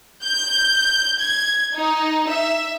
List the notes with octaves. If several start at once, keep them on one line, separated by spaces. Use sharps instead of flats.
G6
G#6
D#4
E5